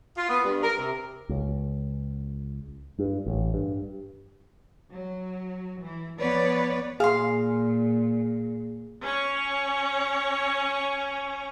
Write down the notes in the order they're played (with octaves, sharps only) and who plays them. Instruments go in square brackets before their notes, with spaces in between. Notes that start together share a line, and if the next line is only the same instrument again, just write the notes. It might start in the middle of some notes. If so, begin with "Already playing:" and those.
[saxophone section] F4
B3
G2
A#4
C3
[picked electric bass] C#2
G2
A1
G2
[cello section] F#3
E3
F3 B3 B4 C#5 D5
[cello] A#2 [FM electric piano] G#4 [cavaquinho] F5 C6
[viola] C#4 C#5